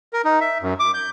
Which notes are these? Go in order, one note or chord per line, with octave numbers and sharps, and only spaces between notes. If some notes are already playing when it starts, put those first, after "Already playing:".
A#4
D#4
E5
F#2
D6
G6